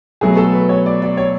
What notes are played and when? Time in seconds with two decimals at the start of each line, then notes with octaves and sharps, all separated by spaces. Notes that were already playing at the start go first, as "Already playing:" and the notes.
0.21 B2 F#3 A3 G#4
0.37 A4
0.53 B4
0.69 C#5
0.86 D5
1.02 D5
1.17 C#5